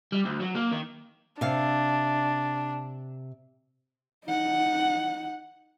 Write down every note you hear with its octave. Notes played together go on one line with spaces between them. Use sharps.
G3
D2
F#3
A#3
D#3
C3 D4 F5
D#4 F#5